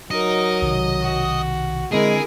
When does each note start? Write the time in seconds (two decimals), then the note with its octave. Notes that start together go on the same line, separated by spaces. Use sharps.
0.11 F#3 D#4 A#4 D#5
0.62 B1 C3 D#3
1.02 F#4
1.93 D3 G#3 C4 D4 E4 G#4 A#4